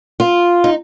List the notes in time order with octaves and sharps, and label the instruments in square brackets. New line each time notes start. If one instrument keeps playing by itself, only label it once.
[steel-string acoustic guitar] F4
D#4